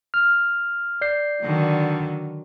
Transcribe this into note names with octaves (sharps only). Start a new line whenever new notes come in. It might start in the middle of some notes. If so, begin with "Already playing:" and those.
F6
D5 G6 C7
D3 D#3 F#3